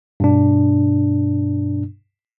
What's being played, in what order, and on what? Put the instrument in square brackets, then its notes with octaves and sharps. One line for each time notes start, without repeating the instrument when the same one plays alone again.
[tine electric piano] G2 B2 D4